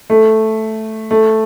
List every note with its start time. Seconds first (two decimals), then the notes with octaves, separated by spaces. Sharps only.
0.10 A3
1.11 A3